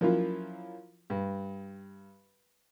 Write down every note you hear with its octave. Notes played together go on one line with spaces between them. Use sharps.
F3 F#3 A#3 C#4 E4 F4
G2